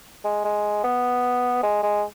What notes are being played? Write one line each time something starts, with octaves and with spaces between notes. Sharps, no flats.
G#3
G#3
B3
G#3
G#3